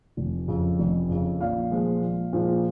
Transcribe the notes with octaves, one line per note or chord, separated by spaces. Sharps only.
F1
F2 C#3
F1
F2 C#3
A#1 F5
A#2 F3 G#3
A#1
A#2 F3 G#3